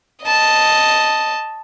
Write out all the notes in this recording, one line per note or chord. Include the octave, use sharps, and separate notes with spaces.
D#5 A5